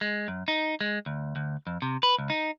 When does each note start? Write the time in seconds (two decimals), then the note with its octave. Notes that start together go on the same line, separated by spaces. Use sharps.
0.01 G#3
0.28 F#2
0.48 D#4
0.81 G#3
1.06 D2
1.36 D2
1.67 F2
1.82 C3
2.03 B4
2.18 C#2
2.30 D#4